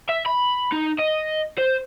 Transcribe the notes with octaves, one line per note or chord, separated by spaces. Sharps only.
E5
B5
D#4
D#5
C5